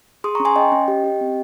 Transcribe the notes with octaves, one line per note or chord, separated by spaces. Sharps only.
G#4 C6 D#6
C#4 A#5 C#6
G#5 C6
C#4 D#5 G5
C#4
G4
G4
C4